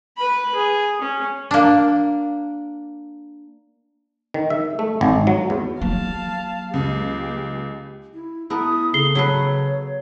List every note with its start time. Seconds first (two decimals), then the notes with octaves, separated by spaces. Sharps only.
0.17 B4 B5
0.55 G#4
1.01 C#4
1.51 A#3 D4
4.34 D#3
4.50 E5
4.79 A3
5.01 G#1
5.27 F#3
5.50 E2
5.81 F#3 A#3 F5 A5
6.74 C#2 G4
8.14 E4
8.50 B3 E4 A4 A#4 D#6
8.94 C#3 A4 C7 G7
9.15 F#3 A4 B4 C#5